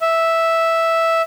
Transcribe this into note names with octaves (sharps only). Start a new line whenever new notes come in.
E5